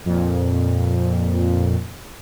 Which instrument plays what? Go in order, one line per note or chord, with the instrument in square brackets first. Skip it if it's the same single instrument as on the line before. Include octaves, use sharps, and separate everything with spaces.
[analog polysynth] F2 A#2